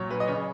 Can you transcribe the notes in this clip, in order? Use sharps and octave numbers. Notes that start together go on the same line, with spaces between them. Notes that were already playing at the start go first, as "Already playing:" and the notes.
Already playing: A#2 F#3 C#5
B4
D#5
C#3 C#5